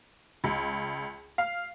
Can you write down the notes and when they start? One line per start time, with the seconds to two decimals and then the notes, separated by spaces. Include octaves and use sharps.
0.44 C#2
1.38 F5